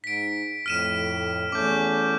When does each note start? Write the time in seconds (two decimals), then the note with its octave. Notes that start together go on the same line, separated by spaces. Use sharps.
0.04 G#2 B6 D7
0.66 F2 A2 F6 D#7 E7
1.52 E2 A3 C#4 D6 G6